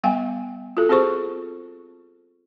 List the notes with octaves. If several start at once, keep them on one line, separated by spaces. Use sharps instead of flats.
G3 B3 F5 G5 G#5
F4 F#4 A4
C4 F#4 G#4 C5 C#6